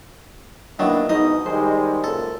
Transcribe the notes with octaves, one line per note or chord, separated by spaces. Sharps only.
D#3 F#3 A#3 B3 D4 E4
G#2 B2 D#4 D#5
D#3 G3 G#3 C5
C#2 F#2 A#2 A4